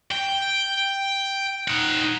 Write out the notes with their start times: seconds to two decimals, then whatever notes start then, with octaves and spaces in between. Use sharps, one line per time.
0.12 G5
1.68 D#4 F#5